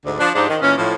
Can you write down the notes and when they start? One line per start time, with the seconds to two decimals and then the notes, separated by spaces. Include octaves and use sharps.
0.05 D2 G#2 D3
0.19 F3 D4
0.34 G#2 F3 D4 D#4 G4
0.49 D#3
0.62 A#2 E3 C#4
0.77 A2 F3